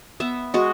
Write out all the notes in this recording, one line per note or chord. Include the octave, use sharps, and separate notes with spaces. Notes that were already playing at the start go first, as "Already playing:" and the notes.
B3 E5
G#3 F#4